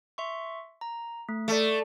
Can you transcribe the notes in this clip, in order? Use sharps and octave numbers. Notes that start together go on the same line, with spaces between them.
E5 C6 C#6
A#5
A3
A3 A4 D5